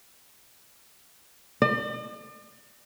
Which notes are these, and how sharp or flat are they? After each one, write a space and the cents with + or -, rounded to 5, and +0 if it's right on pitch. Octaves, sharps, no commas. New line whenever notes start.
D5 +45